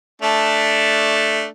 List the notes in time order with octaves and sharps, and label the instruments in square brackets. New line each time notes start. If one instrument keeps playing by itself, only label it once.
[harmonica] A3 D4